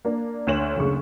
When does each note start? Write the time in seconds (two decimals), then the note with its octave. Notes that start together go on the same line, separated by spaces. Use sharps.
0.05 A#3 D4
0.47 D2 C#5 E7 F#7
0.76 F#1 D2 C#3 C#6